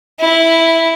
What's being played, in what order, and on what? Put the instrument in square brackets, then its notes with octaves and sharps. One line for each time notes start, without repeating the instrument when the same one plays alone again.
[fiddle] E4